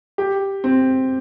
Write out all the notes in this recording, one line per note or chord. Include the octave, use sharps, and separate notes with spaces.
G4
C4